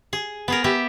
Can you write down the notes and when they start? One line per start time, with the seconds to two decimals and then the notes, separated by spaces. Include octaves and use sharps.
0.13 G#4
0.48 B3 G#4 A#4
0.64 B3 G4 E5